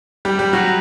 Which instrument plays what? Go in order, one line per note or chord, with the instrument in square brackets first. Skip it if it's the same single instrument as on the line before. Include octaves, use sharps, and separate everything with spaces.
[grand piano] G3 G4
G3 G4
F#3 F#4